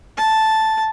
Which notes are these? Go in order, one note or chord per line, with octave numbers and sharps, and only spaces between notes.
A5